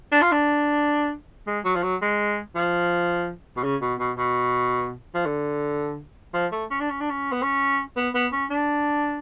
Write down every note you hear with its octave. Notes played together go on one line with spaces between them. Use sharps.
D4
F4
D4
G#3
F#3
F3
F#3
G#3
F3
B2
C#3
B2
B2
B2
F3
D3
F3
A3
C#4
D4
C#4
D4
C#4
B3
C#4
B3
B3
C#4
D4